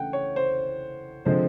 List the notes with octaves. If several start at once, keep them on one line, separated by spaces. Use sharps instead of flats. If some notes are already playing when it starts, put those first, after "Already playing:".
Already playing: C#3 E3 A3 D4 F#5 G5
C#5
C5
D3 F3 G#3 C4 C5